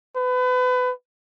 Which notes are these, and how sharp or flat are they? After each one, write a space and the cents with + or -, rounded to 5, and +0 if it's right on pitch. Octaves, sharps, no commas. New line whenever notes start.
B4 +30